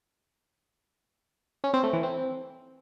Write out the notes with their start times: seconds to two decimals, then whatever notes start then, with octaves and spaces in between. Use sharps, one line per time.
1.64 C#4
1.74 C4
1.83 A3
1.93 E3
2.03 C4